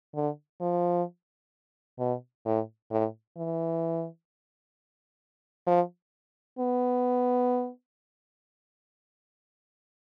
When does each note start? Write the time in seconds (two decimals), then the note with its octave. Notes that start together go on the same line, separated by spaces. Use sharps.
0.15 D3
0.61 F3
1.99 B2
2.45 A2
2.91 A2
3.37 E3
5.66 F3
6.59 B3